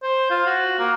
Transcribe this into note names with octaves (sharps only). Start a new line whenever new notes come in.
C5
F4
F#4
A#3